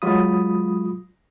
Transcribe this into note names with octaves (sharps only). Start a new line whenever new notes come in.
F#3 G#3 F4 B5 D#6